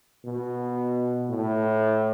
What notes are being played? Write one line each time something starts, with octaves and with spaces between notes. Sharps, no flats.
B2
A2